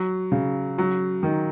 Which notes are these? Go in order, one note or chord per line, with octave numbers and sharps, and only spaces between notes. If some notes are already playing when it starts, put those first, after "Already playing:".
Already playing: F#3
C#3
F#3
D#3